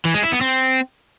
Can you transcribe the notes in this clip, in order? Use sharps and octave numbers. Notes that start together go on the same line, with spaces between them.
E3
G#3
E4
B3
C4